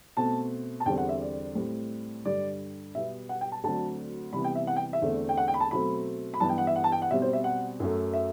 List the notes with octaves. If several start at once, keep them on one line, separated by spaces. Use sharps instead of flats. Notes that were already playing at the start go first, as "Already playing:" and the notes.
B2 A3 C4 A5
A5
E2 D3 G3 C4 G5
F#5
E5
D5
A2 G3 C4
G2 D3 G3 D5
B2 G3 B3 E5
F#5
G5
A5
D2 D3 F#3 C4 A5
C2 C3 E3 B3 B5
G5
E5
F#5
G5
E5
E2 D3 A3 C4
G5
F#5
G5
B5
A5
B2 F#3 A3 C4 B5
B5
G2 E3 B3 A5
G5
F#5
E5
F#5
A5
G5
F#5
B2 G3 C4 E5
C5
E5
F#5
F#2 F#3 A3
E5